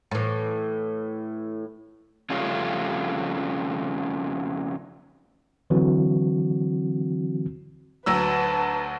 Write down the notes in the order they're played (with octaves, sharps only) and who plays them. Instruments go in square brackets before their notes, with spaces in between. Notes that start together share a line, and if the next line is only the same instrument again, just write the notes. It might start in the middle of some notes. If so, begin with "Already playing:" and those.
[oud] A2 E3
[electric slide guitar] F2 C#3 G3 A3 C#4 F4
[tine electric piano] D3 E3 F#3 C4 F#4
[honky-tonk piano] D2 F#3 E6 [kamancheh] B4 A5